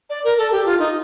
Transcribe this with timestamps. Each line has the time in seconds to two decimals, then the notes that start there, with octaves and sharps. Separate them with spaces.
0.10 D5
0.24 A#4
0.38 A4
0.51 G4
0.65 F4
0.79 D#4